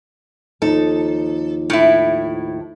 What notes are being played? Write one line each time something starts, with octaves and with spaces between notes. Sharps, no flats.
D#2 F3 D#4 A4
A2 E4